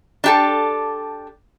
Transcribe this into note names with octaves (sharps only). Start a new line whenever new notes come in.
D4 G4 A4